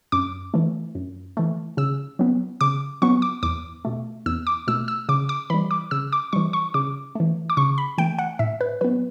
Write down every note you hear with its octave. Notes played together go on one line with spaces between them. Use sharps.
F#2 D6
E3 A3
F#2
E3 A3
C#3 E6
F#3 B3
C#3 D6
F#3 B3 C#6
D6
E2 D6
B2 A3
E2 E6
D6
B2 A3 E6
E6
C#3 D6
D6
E3 G3 B5
D6
C#3 E6
D6
E3 G3 C#6
C#6
C#3 D6
E3 A3
D6
C#3 C#6
B5
E3 A3 G5
F#5
A2 E5
B4
F#3 B3 B4